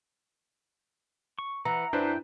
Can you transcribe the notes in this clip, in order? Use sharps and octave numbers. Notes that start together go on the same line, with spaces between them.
C#6
E3 F#5 A#5
F#2 D4 E4 B4 C5 G5